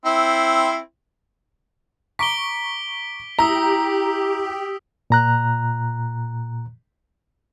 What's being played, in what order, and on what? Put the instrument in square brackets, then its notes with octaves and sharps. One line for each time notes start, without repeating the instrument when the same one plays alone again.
[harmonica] C4 E4
[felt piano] A#5 C#6 D6 [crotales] B6 D7 G7
[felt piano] E4 [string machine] G4 [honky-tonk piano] A#5 [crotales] D#6 E6 B6
[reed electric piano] A#2 A#5 F#6